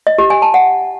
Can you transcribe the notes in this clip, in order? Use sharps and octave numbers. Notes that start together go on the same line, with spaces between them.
D#5
G4
G#5
A5
F#5